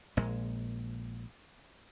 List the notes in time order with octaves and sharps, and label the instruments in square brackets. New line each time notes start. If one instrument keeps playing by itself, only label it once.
[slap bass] A#1 A#2 G#3